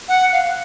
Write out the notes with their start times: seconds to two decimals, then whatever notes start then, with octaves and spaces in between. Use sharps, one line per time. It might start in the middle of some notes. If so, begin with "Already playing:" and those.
0.09 F#5
0.32 F5